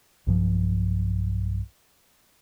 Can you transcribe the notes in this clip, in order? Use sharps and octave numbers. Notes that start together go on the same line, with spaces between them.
B1 G2 F3